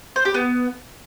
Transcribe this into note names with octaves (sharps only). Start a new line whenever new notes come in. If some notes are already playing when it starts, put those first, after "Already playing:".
C5
G4
B3